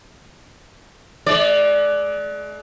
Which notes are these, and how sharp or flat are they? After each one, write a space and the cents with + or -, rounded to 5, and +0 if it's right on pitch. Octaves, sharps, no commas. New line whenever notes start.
G#3 +40 D5 +0